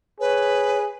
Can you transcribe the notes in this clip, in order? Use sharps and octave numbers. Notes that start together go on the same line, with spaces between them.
G#4 B4 C#5